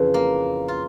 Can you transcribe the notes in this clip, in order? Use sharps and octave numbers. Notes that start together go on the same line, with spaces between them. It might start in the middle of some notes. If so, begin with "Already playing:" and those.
Already playing: F2 C#3 E3
A#3
F4